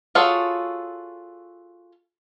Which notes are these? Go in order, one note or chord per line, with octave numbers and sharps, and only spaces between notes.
F4 F#4 G#4 A4 C#5